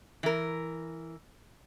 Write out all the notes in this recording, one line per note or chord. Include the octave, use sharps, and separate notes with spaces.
E3 A#4